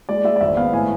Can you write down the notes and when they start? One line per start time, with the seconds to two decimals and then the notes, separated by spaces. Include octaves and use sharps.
0.09 G#3 D5
0.24 G#3 E5
0.36 D5
0.41 G#1 E5
0.57 B3 F5
0.73 A2 G#5